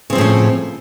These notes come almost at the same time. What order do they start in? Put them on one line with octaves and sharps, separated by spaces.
C#3 C4 F3 A2 C#4